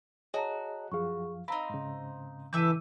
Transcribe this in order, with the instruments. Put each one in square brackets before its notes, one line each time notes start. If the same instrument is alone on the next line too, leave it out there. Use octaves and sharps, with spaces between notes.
[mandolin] F#4 [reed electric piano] G#4 D#5 [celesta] C#5 A5 A#5
[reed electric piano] F#2 F3 F5 [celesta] G#4 C#6
[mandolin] C4 D#4 [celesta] F5 A#5 [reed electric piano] B5
[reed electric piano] G#2 C#3
[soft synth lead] E3 [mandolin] A4 E5 G6 [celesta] D6 E6 D#7